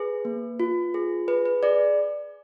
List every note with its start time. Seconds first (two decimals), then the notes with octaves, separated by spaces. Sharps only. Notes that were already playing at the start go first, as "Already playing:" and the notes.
Already playing: G#4 B4
0.25 A#3
0.60 F4
0.94 G#4
1.28 G#4 B4
1.46 B4
1.63 G#4 D5